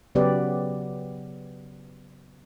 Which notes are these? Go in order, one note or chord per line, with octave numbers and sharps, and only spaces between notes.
C#3 F#3 B3 G4 B4 D5